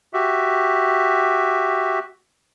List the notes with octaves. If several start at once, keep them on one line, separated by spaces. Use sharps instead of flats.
F#4 G4 E5